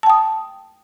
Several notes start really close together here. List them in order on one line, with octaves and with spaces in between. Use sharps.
A5 G5 D#6